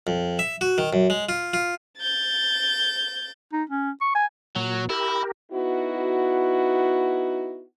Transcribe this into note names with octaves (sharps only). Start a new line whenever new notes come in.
F2
E5
F#4
D#3
F#2
G#3
F4
F4
G6 A6
D#4
C#4
C#6
G#5
A#2 F#3
E4 G4 A#4
B3 D#4 E4 F#4